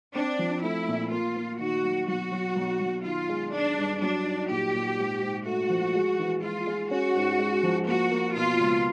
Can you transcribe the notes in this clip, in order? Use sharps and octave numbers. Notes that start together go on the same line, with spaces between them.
C4 D4
F3
A3 E4
A#2
A#3 F4
A#3
D#3 F#4
F#3
B1 F#4
F#3
B1
B1
D#3 F4
G#3
G#3 D4
G2
F#3 D4
D#4
A#2 G4
A#2
G#2
G#2
A3 F#4
F3
G#3
E3
G#3 F4
G#3
C#4 F#4
G#2
G#3
F3
A#3 F#4
A#3
B2 F4
C#2